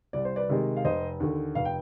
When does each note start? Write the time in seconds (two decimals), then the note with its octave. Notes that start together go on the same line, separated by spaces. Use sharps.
0.13 C2 D5
0.25 C5
0.36 B4 D5
0.49 C3 D#3 G#3
0.76 F5
0.84 F1 C5 D#5
1.20 D#2 D3
1.55 F1 F5
1.65 G5